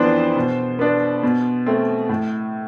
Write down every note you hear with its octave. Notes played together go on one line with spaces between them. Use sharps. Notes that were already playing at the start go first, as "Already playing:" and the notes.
Already playing: F2 E3 B3 D4 C5
B2
B3 D4
B2
A3 C4
A2